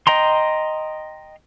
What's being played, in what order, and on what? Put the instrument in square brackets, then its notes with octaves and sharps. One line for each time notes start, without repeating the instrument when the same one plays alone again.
[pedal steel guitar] D#5 G5 A#5 C6